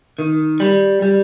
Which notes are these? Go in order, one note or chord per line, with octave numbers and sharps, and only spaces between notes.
D#3
G3
G3